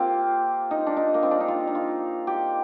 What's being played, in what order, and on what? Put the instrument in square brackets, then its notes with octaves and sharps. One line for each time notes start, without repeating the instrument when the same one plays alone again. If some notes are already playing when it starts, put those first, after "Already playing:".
Already playing: [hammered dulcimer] A#3 C4 F4 G4
D#4
D4
D#4
A#3
C4
D4
D#4
F4
D#4
F4
G4